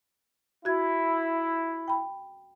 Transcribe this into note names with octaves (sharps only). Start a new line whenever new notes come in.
E4 F#4 G#6
G5 B5